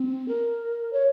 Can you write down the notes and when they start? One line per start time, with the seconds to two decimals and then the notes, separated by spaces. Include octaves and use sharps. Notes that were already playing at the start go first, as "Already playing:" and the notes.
Already playing: C4
0.28 A#4
0.93 C#5